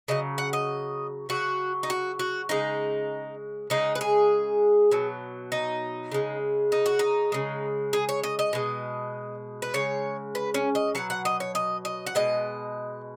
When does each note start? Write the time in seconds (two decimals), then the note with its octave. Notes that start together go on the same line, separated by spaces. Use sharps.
0.08 C#3 F#3 D#5
0.38 F#5
0.53 D#5
1.29 C#3 F#3 F#4
1.83 D#4
1.90 F#4
2.19 F#4
2.49 C#3 G#3 D#4
3.70 C#3 G#3 D#4
3.95 B4
4.01 G#4
4.92 B2 F#3
5.52 D#4
6.12 C#3 G#3
6.72 D#4
6.86 F#4
6.99 D#4
7.32 C#3 G#3
7.93 G#4
8.09 C#5
8.24 D#5
8.39 D#5
8.53 B2 G#3
9.62 B4
9.74 C#3 G#3 C#5
10.35 B4
10.54 C#4
10.75 D#5
10.95 B2 F#3 F#5
11.10 F#5
11.25 D#5
11.40 C#5
11.55 D#5
11.85 D#5
12.07 F#5
12.15 B2 G#3 D#5